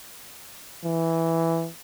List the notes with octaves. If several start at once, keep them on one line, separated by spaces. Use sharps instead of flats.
E3